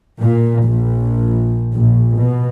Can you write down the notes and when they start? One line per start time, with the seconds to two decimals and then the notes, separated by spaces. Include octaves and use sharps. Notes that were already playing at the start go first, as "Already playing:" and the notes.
0.21 A#2
0.63 A#1
1.74 A#1
2.18 B2